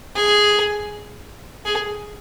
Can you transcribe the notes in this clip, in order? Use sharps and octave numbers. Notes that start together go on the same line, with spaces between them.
G#4
G#4